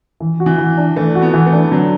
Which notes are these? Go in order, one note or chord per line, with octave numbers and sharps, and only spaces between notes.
E3
F#4
E3
E3
D4
E3 A3
F#4
B3
E3
A3
D4
D3 F#3